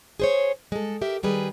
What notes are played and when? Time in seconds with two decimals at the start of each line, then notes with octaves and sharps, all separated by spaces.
0.20 G#4 C5 C#5
0.72 G#3 A4
1.02 G4 A#4 E5
1.23 D#3 G3 G4 G#4 B4